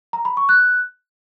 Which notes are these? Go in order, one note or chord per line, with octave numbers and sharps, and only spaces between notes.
A#5
B5
C#6
F#6